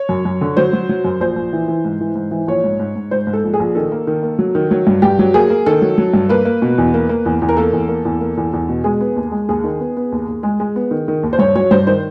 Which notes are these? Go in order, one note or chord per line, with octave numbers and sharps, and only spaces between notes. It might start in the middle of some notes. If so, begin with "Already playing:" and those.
Already playing: C#5
F#2
F#2
D3
F#3 C5
F#3
F#3
F#2
A#1 C5
A#1
E3
E3
G#2
E3
G#2
E3
A#1 C#5
G#2
G#2
G#2
G#2 C5
G#2
A4
A#1
G#4
A#1
D#3 A4
A#3
D#3
A#3
F#3
D#3
F#3
G2
G2 G4
F#3
A#3 G#4
A#3
D#3 A4
F#3
F#3
G2
A#3 B4
A#3
B2
E2
A#3
A#3
E2
E2
A#4
A#3 A4
E2
A#3
E2
A#3
E2
E2
B2
G#3 G#4
B3
D#2
G#3
D#2 G#4
D#3
B3
B3
D#2
D#2
G#3
G#3
B3
D#3
D#3
D#2
C5
G2 C#5
F#3 C#5
G2 C5
D#3 C5